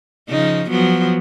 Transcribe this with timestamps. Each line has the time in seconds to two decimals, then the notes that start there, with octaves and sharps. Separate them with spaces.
0.30 C#3 F3 D#4
0.70 F3 F#3 B3